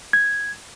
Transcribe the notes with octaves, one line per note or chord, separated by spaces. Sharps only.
G#6